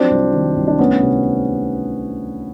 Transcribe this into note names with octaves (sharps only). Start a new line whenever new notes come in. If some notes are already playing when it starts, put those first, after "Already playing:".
Already playing: F3 F#3 C4 D4
C2
D#3
C2
D4
D2 B3 C#4
C3